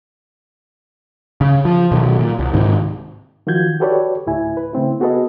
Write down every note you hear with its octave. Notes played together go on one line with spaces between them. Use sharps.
C#3
F3
B2 D#3 F#3
A#2
C2
G#2 C3 D#3
D#3 F3 F4 F#4 G6 G#6
F#4 G4 A4 B4 C#5 D5
D2 A2 E4 G#5
B4
C#3 A3 C4 E4
B3 F#4 G#4 A4 B4 D#5